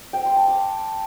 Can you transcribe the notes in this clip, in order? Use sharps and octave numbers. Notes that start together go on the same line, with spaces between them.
G5
C6
A5
D6